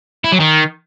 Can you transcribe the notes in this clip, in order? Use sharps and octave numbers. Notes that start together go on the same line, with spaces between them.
E4
F#3
D#3